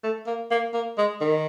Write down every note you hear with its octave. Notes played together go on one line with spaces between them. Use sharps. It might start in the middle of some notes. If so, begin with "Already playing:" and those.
A3
A#3
A#3
A#3
G#3
D#3